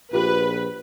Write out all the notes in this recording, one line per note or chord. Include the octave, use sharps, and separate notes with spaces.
A#1 F4 G4 B4